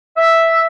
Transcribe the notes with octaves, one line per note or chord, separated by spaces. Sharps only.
E5